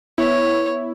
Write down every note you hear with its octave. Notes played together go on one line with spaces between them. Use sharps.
B3 E4 C#5